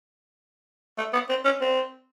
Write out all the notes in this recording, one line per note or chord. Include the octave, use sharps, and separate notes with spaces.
A3
B3
C4
C#4
C4